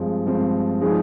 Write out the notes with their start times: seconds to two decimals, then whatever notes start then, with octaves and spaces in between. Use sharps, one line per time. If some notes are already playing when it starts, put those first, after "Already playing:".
Already playing: G2 F3 G#3 C4
0.27 G2 F3 G#3 C4
0.81 F3 G#3 D#4 G#4